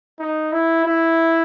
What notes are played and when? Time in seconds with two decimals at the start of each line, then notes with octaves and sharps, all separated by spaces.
0.19 D#4
0.52 E4
0.85 E4